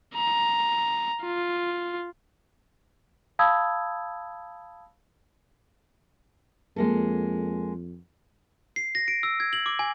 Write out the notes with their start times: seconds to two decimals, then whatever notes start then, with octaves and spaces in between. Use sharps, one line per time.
0.16 A#5
1.23 F4
3.39 F5 A5 B5 D#6 E6 G#6
6.76 F2 G#3 A#3 A4
8.76 C7
8.95 A#6
9.08 D7
9.23 E6
9.40 G#6
9.53 F#7
9.66 D6
9.79 G#5